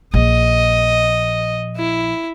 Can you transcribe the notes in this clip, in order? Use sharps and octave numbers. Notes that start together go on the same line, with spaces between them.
A#1 D#5
E4